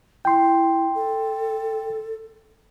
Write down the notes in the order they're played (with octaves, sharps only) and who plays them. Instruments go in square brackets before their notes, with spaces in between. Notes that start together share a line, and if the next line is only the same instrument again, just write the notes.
[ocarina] E4 [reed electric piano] G5 C6
[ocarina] A4